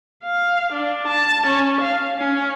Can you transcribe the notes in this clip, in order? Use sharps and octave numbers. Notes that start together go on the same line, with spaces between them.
F5
D4
A5
C#4
F5
C#4